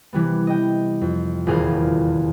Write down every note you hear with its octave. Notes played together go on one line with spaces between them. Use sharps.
C3 E3 G3 B3
D#5 G5
F2
D#1 E2 G#4 C5 F5 A6